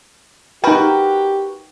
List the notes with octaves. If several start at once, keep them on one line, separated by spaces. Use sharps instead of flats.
D#4 F#4 G4 A#4 B4 G5